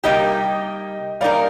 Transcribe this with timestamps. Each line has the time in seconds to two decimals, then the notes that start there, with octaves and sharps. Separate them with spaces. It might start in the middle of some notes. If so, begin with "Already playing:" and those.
0.04 C3 G3 A#3 D#4 G4 D#5 G5
1.21 G3 A#3 D#4 A#4 D5 F5